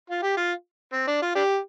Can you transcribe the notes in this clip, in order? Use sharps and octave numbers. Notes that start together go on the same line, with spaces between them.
F4
G4
F4
C4
D4
F4
D4 G4